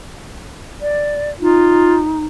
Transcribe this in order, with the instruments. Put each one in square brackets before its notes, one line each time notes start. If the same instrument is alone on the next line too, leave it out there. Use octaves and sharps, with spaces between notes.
[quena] D5
[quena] D#4 [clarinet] F4